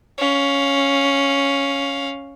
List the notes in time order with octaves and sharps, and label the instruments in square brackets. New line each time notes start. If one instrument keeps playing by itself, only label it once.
[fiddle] C#4 F5